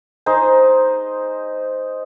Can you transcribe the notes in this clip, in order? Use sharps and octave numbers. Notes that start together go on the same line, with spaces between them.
D#4 G#4 C5